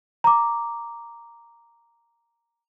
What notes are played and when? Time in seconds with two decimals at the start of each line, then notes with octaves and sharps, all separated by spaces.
0.24 A#5 D6